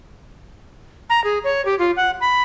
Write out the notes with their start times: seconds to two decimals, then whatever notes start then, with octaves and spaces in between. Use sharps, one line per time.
1.10 A#5
1.24 G#4
1.44 C#5
1.65 G4
1.79 F4
1.96 F#5
2.21 B5